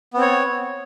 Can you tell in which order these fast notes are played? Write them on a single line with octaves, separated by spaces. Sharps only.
B3 C4 C#5